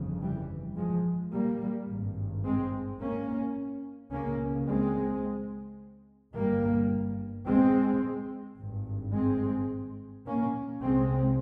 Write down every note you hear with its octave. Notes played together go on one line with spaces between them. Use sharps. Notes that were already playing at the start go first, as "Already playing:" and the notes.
Already playing: G1 F2 C#3
E3 G3
F3 G#3
G3 A#3
G#1 G2
G#3 C4
A#3 C#4
C#2 C#3 A#3 C#4
G#3 C4
G1 G2 G3 A#3
G#3 C4
G#1 G2
G#3 C4
A#3 C#4
C2 C3 G#3 C4